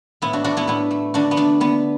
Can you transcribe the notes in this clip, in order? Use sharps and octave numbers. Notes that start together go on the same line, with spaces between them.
A2 B3 E4
D4 F#4
A3 D4 F#4
B3 E4
A2 B3 E4
A3
D3 D4 F#4
B3
A3 D4
D3 B3